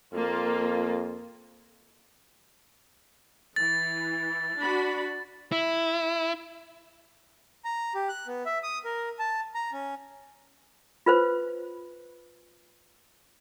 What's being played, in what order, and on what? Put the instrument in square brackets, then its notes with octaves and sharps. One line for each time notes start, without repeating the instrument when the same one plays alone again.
[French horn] F2 [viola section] A#3 F4
[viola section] E3 [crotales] A6
[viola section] D4 F#4 B5
[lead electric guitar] E4
[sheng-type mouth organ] A#5
G4
F#6
B3
E5
D#6
A#4
A5
A#5
C#4
[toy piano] F4 B4 C5